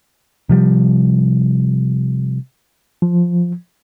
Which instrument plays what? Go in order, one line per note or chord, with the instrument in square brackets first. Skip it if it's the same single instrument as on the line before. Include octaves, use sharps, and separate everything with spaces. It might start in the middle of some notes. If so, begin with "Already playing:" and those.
[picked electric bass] C3 F3 G3
[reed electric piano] F3